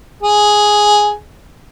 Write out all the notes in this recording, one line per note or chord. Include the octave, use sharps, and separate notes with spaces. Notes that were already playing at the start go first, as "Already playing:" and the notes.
G#4